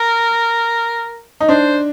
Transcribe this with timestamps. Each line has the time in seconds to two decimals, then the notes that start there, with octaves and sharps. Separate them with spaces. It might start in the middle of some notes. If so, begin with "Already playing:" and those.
Already playing: A#4
1.41 D#4
1.49 D4 C5